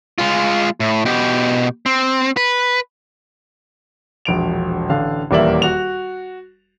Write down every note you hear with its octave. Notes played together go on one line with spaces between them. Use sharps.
G#3 F4
A2
B2 G4
C4
B4
E1 A#1 D7 F7
A1 D3 F5
D#1 E2 A#3 D5 E5 F#7
F#4 F7